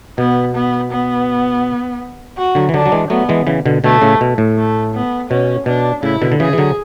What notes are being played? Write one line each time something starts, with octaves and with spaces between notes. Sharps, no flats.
B2 B3
B3
B3
F#4
D3 F#3
E3
D3 F#3 D4
F#3
E3 G#3
F#3 A3 B3
E3 G#3
C#3 E3
B2 D3
B2 D3 A3
A2 C#3
B2
A2
A3
B3
B2 C#4
B2 D4
A2 C#3 E4
B2 D3
D3
C#3 E3 G#4
E3
D3 F#3